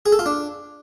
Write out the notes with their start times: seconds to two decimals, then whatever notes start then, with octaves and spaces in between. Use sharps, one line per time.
0.06 G#4
0.12 A4
0.19 F4
0.26 D4